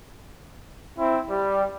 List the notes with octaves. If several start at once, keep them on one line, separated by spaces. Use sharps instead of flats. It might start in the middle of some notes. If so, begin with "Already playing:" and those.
C4 E4
G3